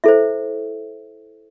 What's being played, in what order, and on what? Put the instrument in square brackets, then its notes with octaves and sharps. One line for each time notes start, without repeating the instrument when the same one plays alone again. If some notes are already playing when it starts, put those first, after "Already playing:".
[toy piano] E4 A4 C5 E5